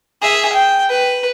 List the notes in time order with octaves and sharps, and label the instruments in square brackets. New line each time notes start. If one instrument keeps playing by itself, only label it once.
[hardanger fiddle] G#4 E5
G5
B4